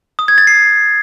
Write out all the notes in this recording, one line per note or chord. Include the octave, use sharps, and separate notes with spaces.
D#6
G#6
A6
C7